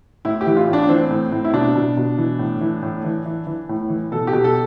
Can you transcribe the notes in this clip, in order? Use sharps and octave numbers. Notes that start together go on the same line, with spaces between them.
A2 E4
G4
E3
F4
A2 D4
E3 C4
A2
A2
E4
B2 D4
B2
B2
E3
A2
E3
A2
E3
E3
E3
A2
E3
B2 A4
G4
B2
A4